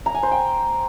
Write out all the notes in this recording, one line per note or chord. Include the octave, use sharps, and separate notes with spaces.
A#5
G#5
C5
G5